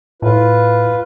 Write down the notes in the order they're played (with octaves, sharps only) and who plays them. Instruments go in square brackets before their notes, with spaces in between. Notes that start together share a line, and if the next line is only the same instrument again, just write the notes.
[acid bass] A2 [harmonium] F4 B4